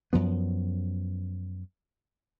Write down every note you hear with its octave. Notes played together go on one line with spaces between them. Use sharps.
F#2 F3 B3